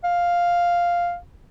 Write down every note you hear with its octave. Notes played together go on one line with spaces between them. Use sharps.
F5